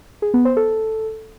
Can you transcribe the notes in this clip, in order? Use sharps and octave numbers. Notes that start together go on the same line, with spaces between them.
G#4
B3
C5
A4